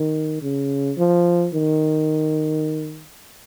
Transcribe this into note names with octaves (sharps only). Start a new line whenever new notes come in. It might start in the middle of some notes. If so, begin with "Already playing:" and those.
Already playing: D#3
C#3
F3
D#3